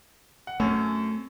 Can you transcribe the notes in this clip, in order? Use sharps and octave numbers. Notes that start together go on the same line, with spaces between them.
F#5
F#2 A3 C4 C#4